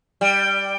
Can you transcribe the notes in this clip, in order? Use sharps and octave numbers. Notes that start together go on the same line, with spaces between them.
G3 G5